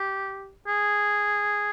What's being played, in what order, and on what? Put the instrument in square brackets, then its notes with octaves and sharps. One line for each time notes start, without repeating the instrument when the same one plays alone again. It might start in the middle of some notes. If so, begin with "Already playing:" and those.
Already playing: [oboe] G4
G#4